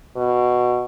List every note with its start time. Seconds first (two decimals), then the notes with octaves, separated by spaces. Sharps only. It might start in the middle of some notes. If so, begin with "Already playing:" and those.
0.16 B2